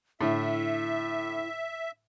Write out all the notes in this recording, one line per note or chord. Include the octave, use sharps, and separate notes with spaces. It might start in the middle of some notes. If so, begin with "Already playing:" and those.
A2 D3 E4 E5